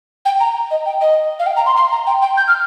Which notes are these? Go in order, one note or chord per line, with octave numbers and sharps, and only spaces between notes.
G5
A#5
D#5
G5
D#5
F5
G5
A#5
C6
C6
A#5
G5
G5
G6
F6